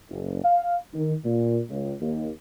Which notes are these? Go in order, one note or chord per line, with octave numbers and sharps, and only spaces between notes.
F#1
F5
D#3
A#2
C#2
D#2